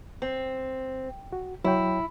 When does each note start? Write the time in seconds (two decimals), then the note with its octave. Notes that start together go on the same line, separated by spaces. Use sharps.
0.22 C4
1.33 F#4
1.64 F#3 E4 C#5 G5